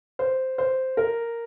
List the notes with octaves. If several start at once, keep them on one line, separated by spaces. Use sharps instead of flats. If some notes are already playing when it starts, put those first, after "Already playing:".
C5
C5
A#4